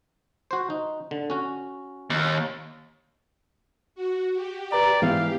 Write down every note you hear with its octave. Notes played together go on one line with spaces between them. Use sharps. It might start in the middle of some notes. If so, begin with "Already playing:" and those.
F#4 C5
D#4
D3
C#4 F#4
D#2
F#4
G4
B4 D5 A#5
G#2 E3 B3 F5